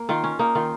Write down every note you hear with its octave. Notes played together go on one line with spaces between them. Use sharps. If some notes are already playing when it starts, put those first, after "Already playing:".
Already playing: A#3
D#3 F4
C#4
A#3 D#4
D#3 F4